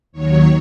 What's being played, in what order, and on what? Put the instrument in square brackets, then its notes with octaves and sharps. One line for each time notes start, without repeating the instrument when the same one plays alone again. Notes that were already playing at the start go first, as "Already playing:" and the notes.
[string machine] D#2 D#3 F#3 C#5